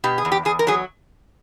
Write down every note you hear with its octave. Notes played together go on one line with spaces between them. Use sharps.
B2 G4
G#4
E2
G4
E2 G#4
A#4
F#3 G#4